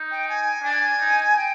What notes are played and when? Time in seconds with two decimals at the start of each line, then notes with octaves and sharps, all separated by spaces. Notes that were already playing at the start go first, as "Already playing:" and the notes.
Already playing: D#4
0.10 G5
0.28 G#5
0.63 D4 G#5
1.00 D#4
1.36 G5